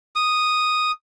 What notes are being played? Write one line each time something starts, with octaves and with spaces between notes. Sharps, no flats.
D#6